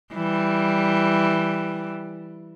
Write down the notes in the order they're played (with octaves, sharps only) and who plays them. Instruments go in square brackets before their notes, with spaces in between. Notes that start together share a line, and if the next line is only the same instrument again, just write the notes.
[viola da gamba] E3 G3